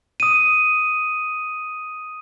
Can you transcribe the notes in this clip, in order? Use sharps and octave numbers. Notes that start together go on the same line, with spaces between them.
D#6 D#7